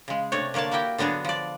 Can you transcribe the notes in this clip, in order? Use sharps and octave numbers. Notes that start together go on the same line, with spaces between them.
C#3 G#3
C3 A3 D4 C#5
D3 A#3 C#5 D5 A5
A#3 E4 F#4 G4 G5
D3 F#3 B3 D4 G#4
F3 D5